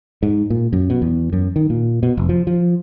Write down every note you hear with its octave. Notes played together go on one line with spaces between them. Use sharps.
G#2
A#2
F#2
B2
E2
F#2
D#3
A#2
B2
F1
F3
F3